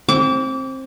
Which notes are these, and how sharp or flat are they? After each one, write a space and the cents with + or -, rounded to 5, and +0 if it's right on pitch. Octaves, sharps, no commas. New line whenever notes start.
C4 +20 D6 -30